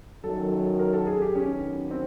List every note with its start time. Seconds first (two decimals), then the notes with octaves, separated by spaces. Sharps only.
0.24 F#2 D#3 F#3 A4
0.52 A4
0.79 A#4
0.93 A4
1.07 G#4
1.22 G4
1.35 D#3 F#3 B3 C#4
1.91 C4